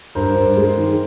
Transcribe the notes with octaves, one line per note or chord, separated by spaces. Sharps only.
G2 A#4 C5
G2
G#3
D#3